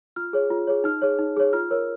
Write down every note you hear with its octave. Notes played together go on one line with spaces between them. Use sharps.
F4 F6
G#4 C#5
F4
G#4 C#5
D#4 F6
G#4 C#5
D#4
G#4 C#5
F4 F6
A#4 C#5